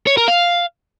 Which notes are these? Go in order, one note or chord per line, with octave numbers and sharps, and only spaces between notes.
C#5
A#4
F5